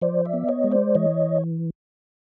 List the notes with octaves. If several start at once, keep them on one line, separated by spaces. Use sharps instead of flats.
F3 C5 D5
D5 E5
B3
C#5 D#5
G#3
C5 D5
E3 C#5 D#5